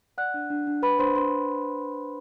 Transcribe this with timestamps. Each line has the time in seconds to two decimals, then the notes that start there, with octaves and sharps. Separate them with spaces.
0.18 D5 F#5 F#6
0.34 D4
0.50 D4
0.67 D4
0.83 D4 B4 B5
0.99 D4 C5 C6
1.15 D4 C5 C6